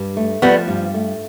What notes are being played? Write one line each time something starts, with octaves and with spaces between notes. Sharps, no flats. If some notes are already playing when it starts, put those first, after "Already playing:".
Already playing: G2
A3
F3 G3 B3
G2
A3